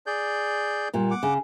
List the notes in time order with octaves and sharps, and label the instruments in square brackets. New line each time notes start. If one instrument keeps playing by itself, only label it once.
[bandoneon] G#4 D5 G6
[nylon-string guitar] A#2 G3
[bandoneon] F#5 D6
[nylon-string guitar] C#3